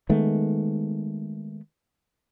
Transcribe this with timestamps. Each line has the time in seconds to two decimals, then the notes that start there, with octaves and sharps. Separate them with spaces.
0.09 D#3 G#3 A3 B3